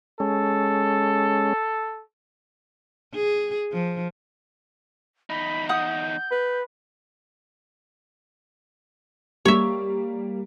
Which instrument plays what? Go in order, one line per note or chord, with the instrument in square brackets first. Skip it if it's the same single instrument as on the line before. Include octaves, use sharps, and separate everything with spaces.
[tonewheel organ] G#3 C#4 [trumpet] A4
[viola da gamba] G#4
F3
[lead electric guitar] E2 D#4 [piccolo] B5
[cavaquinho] F#5 D#6 [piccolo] G6
[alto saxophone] B4
[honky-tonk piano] G3 A#3 [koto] C#5 E5